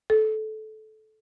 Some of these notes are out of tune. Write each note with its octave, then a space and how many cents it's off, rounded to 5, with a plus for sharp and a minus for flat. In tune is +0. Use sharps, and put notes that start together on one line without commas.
A4 -20